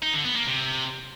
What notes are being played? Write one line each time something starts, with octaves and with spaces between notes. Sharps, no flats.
D#4
D3
B3
A#3
C3